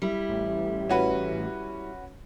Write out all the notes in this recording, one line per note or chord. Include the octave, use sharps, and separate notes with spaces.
G3 E4
A1
C#4 F#4 B4